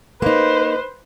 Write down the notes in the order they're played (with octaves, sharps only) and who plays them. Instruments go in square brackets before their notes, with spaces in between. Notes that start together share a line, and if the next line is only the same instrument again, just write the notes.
[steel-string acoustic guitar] A#3 D#4 [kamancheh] B4 C5